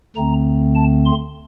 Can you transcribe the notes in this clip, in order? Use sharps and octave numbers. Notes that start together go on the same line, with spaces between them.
D2 D3 A3 C4 A#5
A5
C6